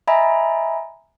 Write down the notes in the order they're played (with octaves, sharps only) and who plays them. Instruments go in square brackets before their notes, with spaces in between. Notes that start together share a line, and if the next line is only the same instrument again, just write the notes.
[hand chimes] D#5 E5 G#5 A#5 B5